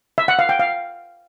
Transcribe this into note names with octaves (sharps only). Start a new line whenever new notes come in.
E5
F#5
F5
G5
F5